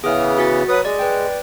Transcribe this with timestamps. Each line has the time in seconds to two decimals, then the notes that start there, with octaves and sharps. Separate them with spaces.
0.04 C#3 E3 B3 G#4 D#6 F6
0.38 F#4 F#5 A6
0.69 F#3 B4 D#6
0.85 G#3 D5
0.99 B4 D5 G5